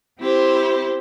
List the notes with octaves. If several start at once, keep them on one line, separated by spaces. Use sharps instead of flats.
C4 E4 G4 C5